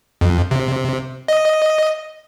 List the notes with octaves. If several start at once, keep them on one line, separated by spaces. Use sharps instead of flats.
F2
C3
D#5